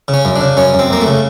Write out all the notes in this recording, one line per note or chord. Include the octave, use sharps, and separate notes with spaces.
C#3
C#4
F#2
D4
C#3
F#2 C#4
F#2
C4
F#2 A#3
A3
C#3